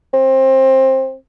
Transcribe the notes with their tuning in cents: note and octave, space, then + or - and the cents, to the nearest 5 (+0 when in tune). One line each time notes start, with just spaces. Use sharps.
C4 +20